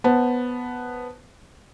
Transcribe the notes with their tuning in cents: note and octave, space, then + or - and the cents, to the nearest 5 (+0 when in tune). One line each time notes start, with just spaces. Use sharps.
B3 +0 C5 +10 A5 +0